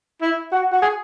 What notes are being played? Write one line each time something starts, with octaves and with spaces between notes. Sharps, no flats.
E4
F#4
F#4
G#4